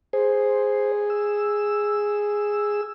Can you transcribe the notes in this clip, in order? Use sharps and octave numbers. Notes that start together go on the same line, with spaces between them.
G#4 C5
E6